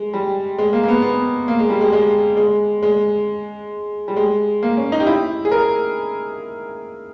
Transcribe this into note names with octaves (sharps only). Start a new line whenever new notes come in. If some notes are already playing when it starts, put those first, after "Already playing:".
Already playing: G#3
G3
G#3
A#3
A#3
B3
B3
A#3
G#3
G3
G#3
G#3
G#3
G#3
G3
G#3
A#3
C#4
D#4
G4
E4
G#4
A#4